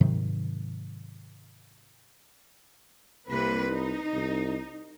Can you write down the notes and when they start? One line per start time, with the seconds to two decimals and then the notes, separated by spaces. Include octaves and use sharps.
0.01 G#2 C3 D#3 F#3
3.29 C2 C3 A#3 B4
3.69 D#4
4.14 C2